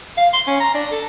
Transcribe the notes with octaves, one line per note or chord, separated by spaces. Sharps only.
F5
C6
C#4
A#5
D4
A4